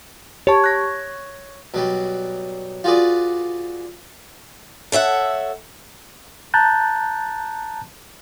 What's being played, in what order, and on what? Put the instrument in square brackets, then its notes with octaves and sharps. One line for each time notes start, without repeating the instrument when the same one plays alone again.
[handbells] G4 A5 [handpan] C#5
[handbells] F#6 A#6
[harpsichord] B2 F#3 G3
F4 F#4 G#4 B4 D5
[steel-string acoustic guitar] A4 C#5 E5 F#5
[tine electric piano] A5 A#5 F#6 G6 A6